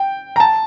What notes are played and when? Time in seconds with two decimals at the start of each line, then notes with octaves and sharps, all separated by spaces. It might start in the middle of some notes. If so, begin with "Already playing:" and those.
Already playing: G5
0.36 A#5
0.40 A5